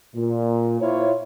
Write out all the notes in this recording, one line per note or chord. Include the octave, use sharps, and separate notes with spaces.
A#2
E4 F4 C5 C#5